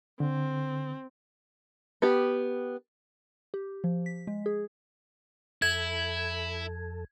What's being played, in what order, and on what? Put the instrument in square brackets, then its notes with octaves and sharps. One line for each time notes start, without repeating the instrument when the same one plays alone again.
[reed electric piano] D3 [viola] C4
[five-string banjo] B3 G4
[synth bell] G4
F3
B6
G#3
G#4
[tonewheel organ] F2 A4 [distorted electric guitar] E4 [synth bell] G#6